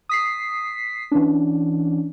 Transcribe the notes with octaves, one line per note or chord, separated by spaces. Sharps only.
D#6 B6 C7
E3 C#4 D4